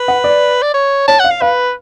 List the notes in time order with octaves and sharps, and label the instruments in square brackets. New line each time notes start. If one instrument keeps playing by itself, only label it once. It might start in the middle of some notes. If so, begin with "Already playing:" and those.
Already playing: [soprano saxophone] B4
[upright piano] F#5
D5
[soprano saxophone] D5
C#5
[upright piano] C#5 [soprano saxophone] A5
[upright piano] F5 [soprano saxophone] F#5
[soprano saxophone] F5
[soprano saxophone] B4 [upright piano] F5